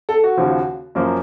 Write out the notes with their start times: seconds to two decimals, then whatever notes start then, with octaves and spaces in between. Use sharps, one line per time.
0.09 A4
0.24 F#4
0.37 D#2 C#3 F3
0.95 F#2 F3 A#3 C#4